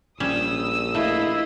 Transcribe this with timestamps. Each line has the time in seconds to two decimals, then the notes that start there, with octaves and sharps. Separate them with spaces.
0.20 A#1 G3 C#4 D#6 E6
0.95 A3 E4 F4 D#5